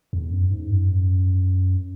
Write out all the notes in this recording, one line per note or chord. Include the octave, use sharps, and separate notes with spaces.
E2
F#2
G#2
F#2